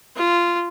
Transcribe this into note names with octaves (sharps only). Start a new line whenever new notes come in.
F4